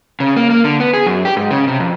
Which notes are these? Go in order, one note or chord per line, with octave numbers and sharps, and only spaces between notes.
C#3
A#3
A#3
D3
B3
G#4
F#2
G4
G#2
C#3
C3
F2